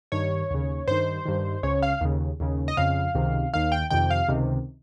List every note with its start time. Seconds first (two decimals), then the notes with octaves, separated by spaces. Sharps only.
0.12 G2 D#3 C#5
0.51 D#2 C#3
0.87 G2 D#3 C5
1.26 G2 D#3
1.63 C#2 C#3 C#5
1.82 F5
2.01 D#2 C#3
2.40 D#2 C#3
2.68 D#5
2.77 F2 C#3 F5
3.15 C#2 C3 D#3
3.54 D#2 D#3 F5
3.72 G5
3.90 F2 C3 D#3 G5
4.10 F5
4.28 C#2 C3 D#3